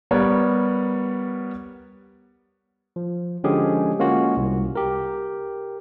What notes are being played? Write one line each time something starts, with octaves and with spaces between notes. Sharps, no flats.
G3 B3 A#4 C#5 D5
F3
D3 F3 G#3 C#4 G4 G#4
G#3 A#3 C#4 F4 F#4
C2
G4 A#4